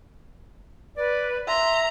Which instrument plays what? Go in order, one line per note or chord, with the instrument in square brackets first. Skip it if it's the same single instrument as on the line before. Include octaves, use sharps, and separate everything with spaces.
[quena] B4 [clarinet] D5
[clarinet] E5 [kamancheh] A#5 [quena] C6